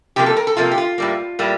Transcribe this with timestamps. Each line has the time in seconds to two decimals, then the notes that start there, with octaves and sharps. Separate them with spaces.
0.16 C3 F3 A#3 G4
0.26 A4
0.37 A#4
0.47 A4
0.57 C3 F3 A#3 F4
0.72 G4
0.78 F4
0.98 A2 G3 A#3
1.39 A2 G3 A#3